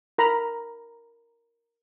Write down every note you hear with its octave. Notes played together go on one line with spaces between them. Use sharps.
A#4 A#5 B5